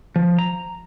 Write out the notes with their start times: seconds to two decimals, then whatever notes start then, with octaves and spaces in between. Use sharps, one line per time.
0.16 F3
0.39 A#5